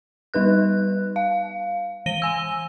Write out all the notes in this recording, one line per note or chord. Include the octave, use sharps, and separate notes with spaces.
G3 D#4 B4 F#6
F5
E3 A#6 D#7 G7
G#5 E6